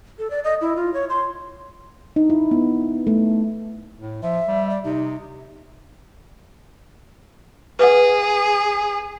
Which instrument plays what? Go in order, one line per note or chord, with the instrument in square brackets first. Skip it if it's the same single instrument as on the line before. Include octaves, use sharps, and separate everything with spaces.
[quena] A4
D5
D#5
E4
F4
C#5
C6
[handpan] D#4
E4
B3
A3
[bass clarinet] A2
[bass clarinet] F3 [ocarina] E5
[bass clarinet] G3
[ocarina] D5
[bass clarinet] C3 [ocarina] D#4
[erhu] G#4 [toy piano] B4 F#5